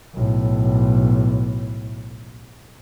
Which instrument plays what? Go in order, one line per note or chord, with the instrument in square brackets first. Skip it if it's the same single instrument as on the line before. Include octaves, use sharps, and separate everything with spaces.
[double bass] B1 A2